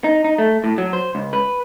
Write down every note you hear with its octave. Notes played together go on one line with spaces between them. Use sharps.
D#4
D#4
A3
A2
F#3
C5
C#2
B4